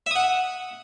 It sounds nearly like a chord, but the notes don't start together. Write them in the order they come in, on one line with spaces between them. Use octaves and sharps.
E5 D#6 F#5